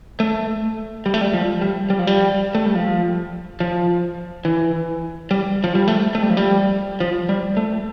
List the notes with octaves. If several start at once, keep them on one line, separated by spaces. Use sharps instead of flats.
A3
G3
A3
G3
F3
G3
G3
F3
G3
A3
G3
F3
F3
E3
G3
F3
G3
A3
A3
G3
F3
G3
F3
G3
A3